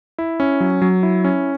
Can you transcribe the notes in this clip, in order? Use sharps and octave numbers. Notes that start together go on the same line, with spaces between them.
E4
C#4
F#3
F#3
E4
C#4